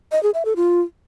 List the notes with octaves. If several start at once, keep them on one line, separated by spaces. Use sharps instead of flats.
D#5
G#4
E5
A4
F4